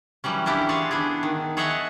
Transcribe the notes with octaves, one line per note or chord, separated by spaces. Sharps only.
E3 F#3 G3 C#4
A#3 C#4 D4 E4 G4
G#4 C5 C#5 A5
B3 D4 E4 G#4
D#3
G#4 C#5 D#5 E5 F#5 A5